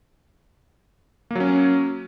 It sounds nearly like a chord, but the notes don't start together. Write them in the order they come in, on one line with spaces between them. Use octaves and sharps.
A#3 F#3 C#4